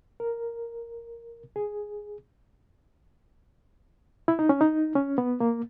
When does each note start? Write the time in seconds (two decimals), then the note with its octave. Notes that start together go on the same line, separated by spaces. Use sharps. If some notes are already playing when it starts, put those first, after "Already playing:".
0.20 A#4
1.56 G#4
4.28 E4
4.39 D#4
4.49 C#4
4.61 D#4
4.95 C#4
5.18 B3
5.40 A#3